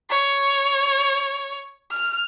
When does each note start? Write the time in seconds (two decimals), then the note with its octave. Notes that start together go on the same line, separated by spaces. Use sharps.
0.10 C#5
1.91 F6